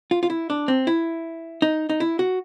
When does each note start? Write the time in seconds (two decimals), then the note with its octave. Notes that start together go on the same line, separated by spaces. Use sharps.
0.11 F4
0.23 F4
0.30 E4
0.50 D4
0.68 C4
0.87 E4
1.62 D#4
1.89 D#4
2.00 E4
2.19 F#4